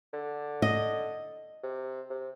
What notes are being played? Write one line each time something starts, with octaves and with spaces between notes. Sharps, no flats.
D3
D#5
C3
C3